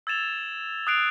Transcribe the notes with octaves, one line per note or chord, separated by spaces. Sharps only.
E6 G#6 A6 E7 F7 G7
D#6 E6 F#6 C7 D7 F7